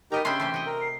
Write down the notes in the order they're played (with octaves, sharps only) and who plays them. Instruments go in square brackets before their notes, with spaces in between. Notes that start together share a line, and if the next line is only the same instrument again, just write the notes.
[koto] B3 D#5 A#5 [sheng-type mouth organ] D#4 G4 A#4
[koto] C#3 C#4 D4 [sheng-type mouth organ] E5 [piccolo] G5 [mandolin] B5 C6
[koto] C3 E3 A3 [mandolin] C6
[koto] F#4 D#5
[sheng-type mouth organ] A#4
[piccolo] C7